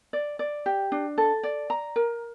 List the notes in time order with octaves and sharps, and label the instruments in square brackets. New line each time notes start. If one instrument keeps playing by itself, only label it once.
[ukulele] D5
D5
G4
D4
A4
D5
A#5
A#4